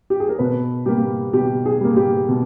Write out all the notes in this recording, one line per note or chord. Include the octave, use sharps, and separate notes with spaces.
G4
G#4
A#4
B2 B4
G3 A#3 G4
B2 G4
G#4
G3 A#3
G4
B2